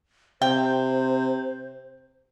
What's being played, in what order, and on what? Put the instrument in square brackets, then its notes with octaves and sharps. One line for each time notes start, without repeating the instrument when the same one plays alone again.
[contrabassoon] C3 [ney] C5 [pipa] G5